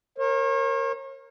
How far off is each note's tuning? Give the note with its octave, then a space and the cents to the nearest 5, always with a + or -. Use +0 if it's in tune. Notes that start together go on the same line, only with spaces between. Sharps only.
A#4 +0 C#5 -40